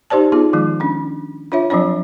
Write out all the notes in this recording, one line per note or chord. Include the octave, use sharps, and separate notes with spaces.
D#4 G4 C5 D5 A5
B3 D#4 F4 G#4
D#3 F3 G#3
C#4 D4
D4 F4 C#5 E5
F3 F#3 C4 D4 C#5